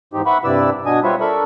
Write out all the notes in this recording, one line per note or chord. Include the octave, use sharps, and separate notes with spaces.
E2 G#2 C4 D#4 G4
B4 E5 F#5 B5 C#6
G2 C3 E4 B4 D5 E6
B2 F#3 D4 D#5 G#5 D#6
G3 C4 F4 B4 C#5 E5
D4 A4 A#4 E5 B5 C#6